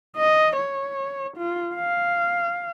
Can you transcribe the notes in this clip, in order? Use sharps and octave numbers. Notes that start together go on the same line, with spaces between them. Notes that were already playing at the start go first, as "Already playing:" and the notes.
D#5
C#5
F4
F5